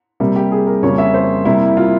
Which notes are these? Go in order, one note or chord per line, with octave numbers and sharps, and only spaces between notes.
C3 G3 A#3
G4
G#4
A#4
F2 C#3 G3 A#3 C#5
E5
C5
C3 G3 A#3 E4
F4